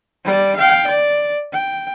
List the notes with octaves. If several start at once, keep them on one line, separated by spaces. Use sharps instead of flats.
G3 D5
F5 G5
D5
G5